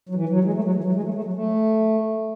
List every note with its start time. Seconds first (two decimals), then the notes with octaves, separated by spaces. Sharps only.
0.09 F#3
0.15 E3
0.29 F#3
0.44 G#3
0.54 A3
0.64 F#3
0.74 E3
0.84 F#3
0.94 G#3
1.04 A3
1.14 A3
1.24 F#3
1.34 A3